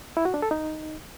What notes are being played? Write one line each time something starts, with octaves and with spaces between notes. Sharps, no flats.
E4
F#4
D4
A4
D#4